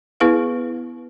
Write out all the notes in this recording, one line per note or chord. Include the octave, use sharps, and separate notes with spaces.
B3 E4 G#4 B4 F5